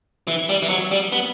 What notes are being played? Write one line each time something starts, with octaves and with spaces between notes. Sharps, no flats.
E3
G3
E3
F#3
G3
B3